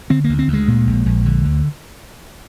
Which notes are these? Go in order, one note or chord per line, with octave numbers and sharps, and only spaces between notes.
D3 C4
D2 A#3
C4
D2
G#3
A#2
A#1
A#1
D3
D2